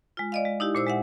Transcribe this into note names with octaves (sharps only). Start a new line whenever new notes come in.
G#3 F4
D5 D#5 F5
G#3
D#4 E4 G4
A#2 C5 E6
G#3 E5 F#5